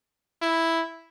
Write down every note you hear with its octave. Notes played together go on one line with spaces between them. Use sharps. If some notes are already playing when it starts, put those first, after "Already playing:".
E4